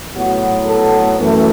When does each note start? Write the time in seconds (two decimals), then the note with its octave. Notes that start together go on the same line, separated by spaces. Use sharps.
0.15 A2 F#3 B3 F#4
0.66 A4
1.17 F#2 E3 A3